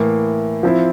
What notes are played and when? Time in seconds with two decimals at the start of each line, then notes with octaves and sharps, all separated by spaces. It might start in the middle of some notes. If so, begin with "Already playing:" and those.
Already playing: A2 E3 A#3
0.63 F3 C4 E4